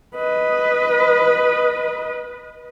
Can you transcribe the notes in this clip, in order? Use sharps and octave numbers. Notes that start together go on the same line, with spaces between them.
B4 D#5